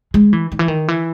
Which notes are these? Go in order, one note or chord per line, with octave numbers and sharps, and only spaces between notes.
G#3
E3
D#3
E3
D#3
E3